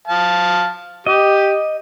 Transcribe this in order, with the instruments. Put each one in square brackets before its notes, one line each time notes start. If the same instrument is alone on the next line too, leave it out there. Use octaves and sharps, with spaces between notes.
[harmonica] F5 A5
[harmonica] G4 [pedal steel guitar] D#5